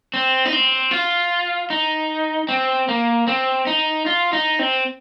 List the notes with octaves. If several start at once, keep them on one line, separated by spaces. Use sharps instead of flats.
C4
D#4
C4
F4
D#4
C4
A#3
C4
D#4
F4
D#4
C4